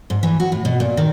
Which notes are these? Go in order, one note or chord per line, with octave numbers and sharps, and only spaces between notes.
G#2
E3
F#4
A2
B2
A#2
D#3